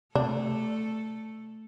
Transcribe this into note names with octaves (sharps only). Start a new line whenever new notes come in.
C3 A3 D4 A4